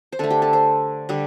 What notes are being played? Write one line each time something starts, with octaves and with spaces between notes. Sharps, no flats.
C5
D3 A3 A4
G4
A4
C5
D3 G3